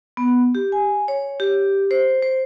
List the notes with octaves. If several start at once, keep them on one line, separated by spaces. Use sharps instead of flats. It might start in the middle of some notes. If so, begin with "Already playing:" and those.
B3
G4
G#5
C#5
G4
C5
C5